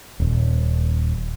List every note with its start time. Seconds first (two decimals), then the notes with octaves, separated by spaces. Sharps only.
0.20 D#1